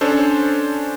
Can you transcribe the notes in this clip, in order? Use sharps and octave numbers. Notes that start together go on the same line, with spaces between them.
C#4 D4 A4 C5